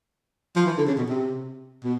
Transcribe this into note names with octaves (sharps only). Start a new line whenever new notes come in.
F3
E3
D3
C#3
B2
C3
B2